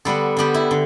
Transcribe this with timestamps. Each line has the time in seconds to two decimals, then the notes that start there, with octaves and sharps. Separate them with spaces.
0.05 D3 G3 B3 D4 A4
0.37 D3 G3 B3 D4 G4
0.54 E4
0.71 D3